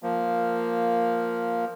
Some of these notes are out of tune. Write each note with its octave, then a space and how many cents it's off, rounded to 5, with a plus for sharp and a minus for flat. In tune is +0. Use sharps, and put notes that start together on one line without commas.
F3 +0 A#3 -5